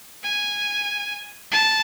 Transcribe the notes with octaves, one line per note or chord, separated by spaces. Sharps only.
G#5
A5